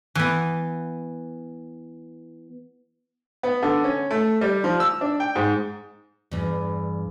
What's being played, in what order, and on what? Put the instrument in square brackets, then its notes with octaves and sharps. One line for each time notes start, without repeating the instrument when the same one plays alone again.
[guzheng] E3 B3
[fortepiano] B3
D3
C#4
A3
G3
F3
E6
D4
G5
G#2
[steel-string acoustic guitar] E2 G2